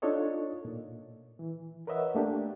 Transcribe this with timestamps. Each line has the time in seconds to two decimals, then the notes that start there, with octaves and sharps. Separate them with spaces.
0.02 D4 D#4 F4 A4 C#5 D#5
0.65 A#2
1.39 E3
1.87 A#4 B4 C#5 D#5 E5 F#5
2.15 A3 A#3 D4 G4